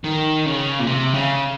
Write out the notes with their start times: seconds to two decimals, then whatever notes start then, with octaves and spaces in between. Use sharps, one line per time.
0.04 D#3
0.46 C#3
0.80 A#2
0.87 C3
1.14 C#3